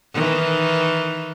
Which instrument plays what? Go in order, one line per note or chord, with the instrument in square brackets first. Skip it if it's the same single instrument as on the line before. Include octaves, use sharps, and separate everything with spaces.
[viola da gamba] D#3 E3